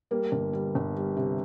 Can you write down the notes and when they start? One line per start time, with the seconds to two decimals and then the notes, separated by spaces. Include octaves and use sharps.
0.11 G3 A#3
0.32 G1
0.53 G3
0.75 G1
0.97 G3
1.17 C3